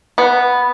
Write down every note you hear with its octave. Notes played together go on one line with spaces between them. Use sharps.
B3